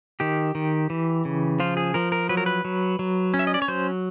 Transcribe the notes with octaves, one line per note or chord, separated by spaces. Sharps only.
D#3 G4
D#3
E3
C#3
F3 F4
G#4
F3 A#4
A#4
F#3 B4
A#4
B4
F#3
F#3
C#4
E5
D#5
D5
C#5
F#3 C5